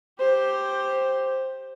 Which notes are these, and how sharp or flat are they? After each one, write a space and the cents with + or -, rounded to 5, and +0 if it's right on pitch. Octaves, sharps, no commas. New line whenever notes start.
G4 +0 C5 +10